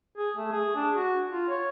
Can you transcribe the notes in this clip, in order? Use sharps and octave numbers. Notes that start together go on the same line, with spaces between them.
G#4
A3
G#4
D4
F#4
F4
C#5